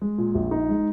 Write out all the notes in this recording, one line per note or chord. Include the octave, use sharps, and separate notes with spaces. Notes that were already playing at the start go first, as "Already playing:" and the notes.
G#3
A#2
A#1
D#4
G#3